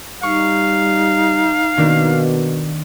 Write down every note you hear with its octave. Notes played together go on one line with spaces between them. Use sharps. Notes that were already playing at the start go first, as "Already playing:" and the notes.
G3 D#4 F5 C#6
B2 D#3 A#3 D4